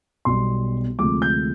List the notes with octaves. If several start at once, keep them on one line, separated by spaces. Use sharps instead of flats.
B1 B2 G3 C6
D2 C3 F3 G#3 D6
G6